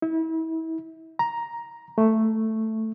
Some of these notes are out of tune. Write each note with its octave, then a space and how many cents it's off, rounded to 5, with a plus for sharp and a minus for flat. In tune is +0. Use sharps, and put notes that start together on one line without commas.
E4 -35
A#5 +5
A3 +5